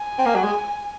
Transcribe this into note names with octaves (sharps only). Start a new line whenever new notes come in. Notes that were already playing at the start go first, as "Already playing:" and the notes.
Already playing: G#5
C4
A#3
F#3
G#3